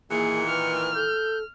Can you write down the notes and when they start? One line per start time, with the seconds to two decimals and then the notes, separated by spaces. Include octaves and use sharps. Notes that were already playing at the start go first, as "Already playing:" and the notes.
0.11 A#2 D#3 E3 A#3 G#4 C#7
0.50 B4 F6
0.95 A4 G6